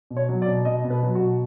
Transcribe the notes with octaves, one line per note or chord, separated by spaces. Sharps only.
B2
C#5
F#3
D5
B2
B2 D#5
B2
B4
F#3
F#4
B2